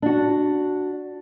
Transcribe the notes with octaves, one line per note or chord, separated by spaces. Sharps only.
D4 F#4